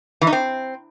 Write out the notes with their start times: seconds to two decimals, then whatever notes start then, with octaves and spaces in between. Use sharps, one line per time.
0.21 E3
0.27 D#4
0.32 C4